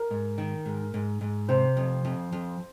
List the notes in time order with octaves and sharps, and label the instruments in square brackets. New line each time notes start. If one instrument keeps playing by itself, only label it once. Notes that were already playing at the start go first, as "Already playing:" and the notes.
Already playing: [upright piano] A#4
[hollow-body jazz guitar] G#2
D#3
G#2
G#2
G#2
[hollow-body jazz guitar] C3 [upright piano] C5
[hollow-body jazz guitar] F2
F2
F2